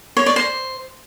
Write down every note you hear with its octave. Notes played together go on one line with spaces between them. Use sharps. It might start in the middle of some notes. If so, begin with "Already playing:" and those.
C#5
D5
C5